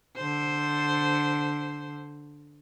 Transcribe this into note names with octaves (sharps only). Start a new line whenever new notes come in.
D3 C5